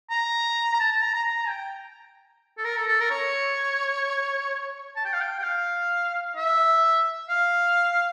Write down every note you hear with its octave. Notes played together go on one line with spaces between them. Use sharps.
A#5
A#5
A5
A5
A#5
A#5
A#5
G5
A4
A#4
A4
A4
A#4
C#5
A5
G5
F5
G5
G5
F5
E5
F5